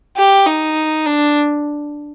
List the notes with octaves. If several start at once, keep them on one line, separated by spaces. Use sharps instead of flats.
G4
D#4
D4